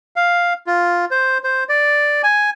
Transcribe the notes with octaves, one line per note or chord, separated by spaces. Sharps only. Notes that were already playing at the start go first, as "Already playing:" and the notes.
F5
F4
C5
C5
D5
G#5